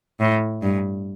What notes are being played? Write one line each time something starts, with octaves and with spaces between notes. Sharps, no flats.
A2
G2